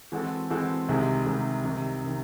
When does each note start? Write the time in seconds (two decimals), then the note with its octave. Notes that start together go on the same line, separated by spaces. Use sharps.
0.12 E3 G#3 C4 F#4 A4
0.50 E3 G#3 C4 F#4 A4
0.89 C2 C3 D#3 G#3
1.26 C2 C3 D#3 G#3
1.64 C2 C3 D#3
2.04 C3 D#3